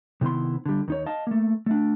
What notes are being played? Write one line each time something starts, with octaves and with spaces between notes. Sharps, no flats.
C3 D#3 B3 E4 C6
D3 G3
D#2 D#4 C#5
D#5 F5 A5
A3 A#3
A3 D4